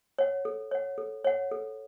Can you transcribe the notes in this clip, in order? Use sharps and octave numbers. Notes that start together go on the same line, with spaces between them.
C#5 F#5
A4
C#5 F#5
A4
C#5 F#5
A4